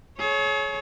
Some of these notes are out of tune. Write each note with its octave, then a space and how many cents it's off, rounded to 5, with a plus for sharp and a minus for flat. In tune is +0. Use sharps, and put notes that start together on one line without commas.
G#4 +40 C#5 +0